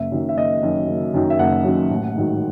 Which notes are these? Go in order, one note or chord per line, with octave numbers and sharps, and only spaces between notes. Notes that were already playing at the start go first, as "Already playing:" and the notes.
Already playing: F#1 E5
F#2 D#3 F#3
E5
F#1 D#5
F#2 D#3 F#3
F#1
F#2 D#3 F#3
E5
F#1 F#5
F#2 D#3 F#3
A1
G#2 D#3 F#3